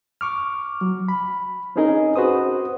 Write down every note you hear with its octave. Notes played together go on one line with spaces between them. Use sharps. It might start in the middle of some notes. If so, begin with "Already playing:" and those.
C#6 D6 F6
F#3
B5
C4 C#4 D#4 G#4 A#4 D#5
F#4 B4 C5 D#6